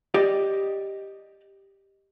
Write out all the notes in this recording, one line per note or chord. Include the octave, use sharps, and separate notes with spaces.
G4 D5 D#5